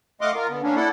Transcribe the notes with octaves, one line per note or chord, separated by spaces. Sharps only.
A3 D#5 F5 F#5 C6 D6
F4 A#4
D3 B3
A#3 C#4 D4
E4 A4 D5 F#5